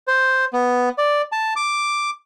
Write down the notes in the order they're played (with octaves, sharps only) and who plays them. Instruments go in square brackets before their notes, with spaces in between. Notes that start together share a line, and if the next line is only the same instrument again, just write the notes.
[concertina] C5
B3
D5
A5
D6